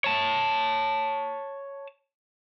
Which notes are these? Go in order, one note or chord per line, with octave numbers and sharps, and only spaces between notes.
C#5 A5